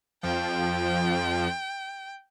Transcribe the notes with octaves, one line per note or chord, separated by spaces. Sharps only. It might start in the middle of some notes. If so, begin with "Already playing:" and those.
F2 F3 G5